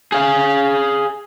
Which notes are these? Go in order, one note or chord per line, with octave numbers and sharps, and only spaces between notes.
G#4 F5